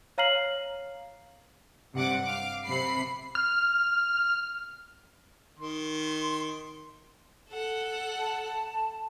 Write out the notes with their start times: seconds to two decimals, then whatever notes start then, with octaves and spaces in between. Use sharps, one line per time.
0.18 C#5 F5 A#5 F6 C7 F#7
1.93 G2 C3 F#5 D6
2.23 F5 D6
2.65 C3 B5 C7
3.35 F6
5.59 D#3 C6
7.49 A4 F#5
8.19 A5